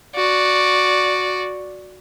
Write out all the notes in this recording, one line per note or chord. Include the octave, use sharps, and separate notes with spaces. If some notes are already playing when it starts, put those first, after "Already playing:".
F#4 D5